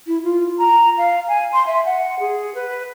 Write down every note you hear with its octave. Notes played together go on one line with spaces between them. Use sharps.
E4
F4
A#5
F5
G#5
C6
E5
F#5
G#4
B4